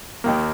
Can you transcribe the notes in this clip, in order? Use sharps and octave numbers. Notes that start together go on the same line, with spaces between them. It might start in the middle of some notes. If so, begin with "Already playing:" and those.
D#2 D#3 A#3